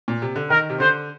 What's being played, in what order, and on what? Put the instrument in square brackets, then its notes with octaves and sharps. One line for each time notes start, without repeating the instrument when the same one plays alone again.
[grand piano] A#2
C3
D3
[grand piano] D#3 [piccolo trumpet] A#4
[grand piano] C3
[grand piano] D3 [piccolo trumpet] C5